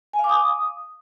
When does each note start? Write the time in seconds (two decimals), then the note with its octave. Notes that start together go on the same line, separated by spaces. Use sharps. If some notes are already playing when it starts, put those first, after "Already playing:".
0.13 G#5
0.19 F5
0.24 D6
0.29 D#6